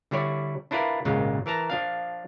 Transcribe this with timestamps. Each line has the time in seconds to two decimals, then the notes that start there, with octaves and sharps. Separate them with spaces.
0.11 D3 G3 E4 C#5 D5
0.71 D4 E4 F4 A#4 B4 D5
1.05 G#1 A#2 C#3 G#3 F4
1.46 E3 A#4 A5 A#5
1.70 F3 D4 F5